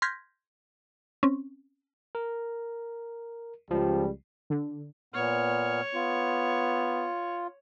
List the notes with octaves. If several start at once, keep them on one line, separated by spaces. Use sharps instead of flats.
C6 F6 G6 G#6 A#6 B6
C4 C#4
A#4
C#2 F3 G3
D3
A#2 B3 C#5 F6
B3 F4